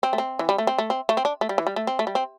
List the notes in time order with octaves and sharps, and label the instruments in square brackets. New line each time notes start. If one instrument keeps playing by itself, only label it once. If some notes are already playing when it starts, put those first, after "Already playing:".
[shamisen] C4
A3
C4
E3
G3
A3
C4
A3
C4
A3
C4
D4
A3
G3
E3
G3
A3
C4
A3
G3
C4